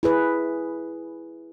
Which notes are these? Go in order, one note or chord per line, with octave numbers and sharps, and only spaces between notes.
E4 G#4 B4